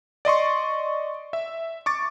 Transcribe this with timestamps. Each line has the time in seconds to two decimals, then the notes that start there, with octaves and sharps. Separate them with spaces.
0.25 D5 D#5 C6 C#6
1.33 E5
1.86 C#6 D6 A6